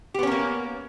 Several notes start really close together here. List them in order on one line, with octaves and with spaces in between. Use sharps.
G4 B3 C#4 A#4 A#3